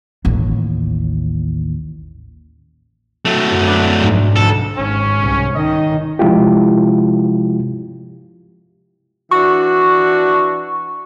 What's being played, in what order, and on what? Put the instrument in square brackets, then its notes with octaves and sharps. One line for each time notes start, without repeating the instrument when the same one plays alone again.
[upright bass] A1 D#2
[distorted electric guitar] F#3 A3
[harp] F#2
D4 B4 D5
B1 G#2
[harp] F1 D2 [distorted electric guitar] A4
[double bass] G#1 [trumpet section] C#4
[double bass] C2
[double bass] D#3 [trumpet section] D#5
[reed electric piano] C3 F3 G#3 E4 F4 G4
[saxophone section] E3 D4 F#4 [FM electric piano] C#6